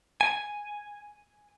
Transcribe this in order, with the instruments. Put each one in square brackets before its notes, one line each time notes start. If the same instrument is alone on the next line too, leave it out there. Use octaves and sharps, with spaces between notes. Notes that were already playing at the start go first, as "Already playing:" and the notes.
[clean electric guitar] G#5